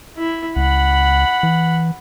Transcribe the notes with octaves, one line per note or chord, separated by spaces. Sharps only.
E4
C#2 F#5 B5
E3